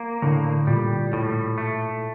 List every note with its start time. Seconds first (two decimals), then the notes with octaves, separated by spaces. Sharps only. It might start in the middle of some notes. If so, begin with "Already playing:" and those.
Already playing: A#3
0.22 A2 D3
0.67 A#2 G3
1.13 A2
1.58 A3